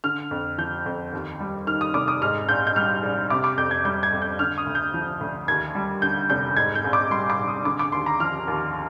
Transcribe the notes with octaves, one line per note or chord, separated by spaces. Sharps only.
D3 F6
F2
F3 G6
F2
D#2
G3
D#3 F6
D#6
F1 D6
D#6
G#2 F6
A#1 G6
G6
G3 F6
A#1
C3 D6
D6
F2 G6
G#6
G3 G6
G#6
F2
G6
D3 F6
D#6
D2
G6
F3
D2
D#2 G#6
G3
D3 G6
F1 G6
G#2 G#6
G6
A#1
D6
G3 C6
D6
A#1
D#6
D3 D6
D6
D#2 C6
A#5
F3 F6
D#2